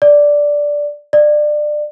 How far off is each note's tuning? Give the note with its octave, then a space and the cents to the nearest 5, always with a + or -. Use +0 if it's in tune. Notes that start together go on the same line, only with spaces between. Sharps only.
D5 -5
D5 +25